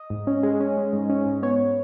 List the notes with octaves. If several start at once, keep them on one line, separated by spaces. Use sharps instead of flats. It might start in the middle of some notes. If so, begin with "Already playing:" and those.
Already playing: D#5
G#2
C#4
G#3
C#4
G#3
G#2
C#4
G#2
B3 C#5
G#2